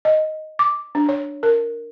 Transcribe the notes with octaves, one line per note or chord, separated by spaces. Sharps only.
D#5
D6
D4
C#5
A#4